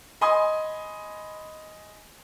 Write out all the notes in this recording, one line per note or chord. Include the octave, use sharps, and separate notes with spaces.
D#5 G#5 B5 C6 D#6